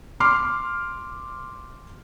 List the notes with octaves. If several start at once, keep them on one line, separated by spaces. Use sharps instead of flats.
C6 D6 F6 C7